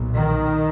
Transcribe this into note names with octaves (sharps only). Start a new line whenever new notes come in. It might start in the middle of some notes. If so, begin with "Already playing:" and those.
Already playing: B1 A#2
D#3